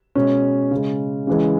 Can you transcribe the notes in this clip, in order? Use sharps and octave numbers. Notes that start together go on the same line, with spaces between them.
B2 G#3 C#4
C#3 G#3
C#3 E3 G#3